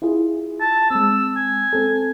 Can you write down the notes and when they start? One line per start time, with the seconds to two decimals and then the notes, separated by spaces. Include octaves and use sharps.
0.02 E4 F4 G#4
0.60 A5
0.91 G#3 C4 E6
1.36 G#5
1.73 C4 A4